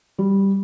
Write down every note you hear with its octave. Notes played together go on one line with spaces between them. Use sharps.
G3